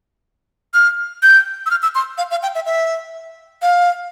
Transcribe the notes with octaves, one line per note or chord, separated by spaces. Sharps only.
F6
G6
E6
F6
E6
C6
F5
F5
G5
E5
E5
F5